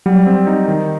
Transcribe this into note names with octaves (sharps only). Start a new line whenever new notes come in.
F#3 G3
C4
D#4
D#3